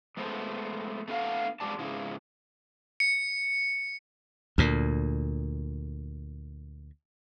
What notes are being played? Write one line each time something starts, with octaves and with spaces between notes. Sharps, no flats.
G#3 A3 B3 C5
A3 B3 D4 A4 F5 F#5
G#2 G3 G#3 D5 A5
G#2 C#3 G#3 D#4 E4
C#7
D2 A#2